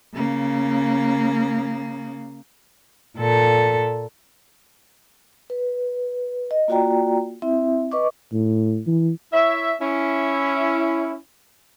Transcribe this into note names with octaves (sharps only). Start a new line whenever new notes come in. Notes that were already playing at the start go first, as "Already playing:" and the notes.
C#3 A#3
A#2 A4
B4
D#5
A#3 F4 F#4 D5 G5 A#5
C4 E4 E5
B4 D#5 C#6 D6
A2
E3
E4 C#5 E5
C#4 E4